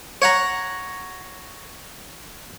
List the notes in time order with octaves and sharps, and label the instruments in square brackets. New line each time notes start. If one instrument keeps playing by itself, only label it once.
[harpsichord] C#5 F#5 A#5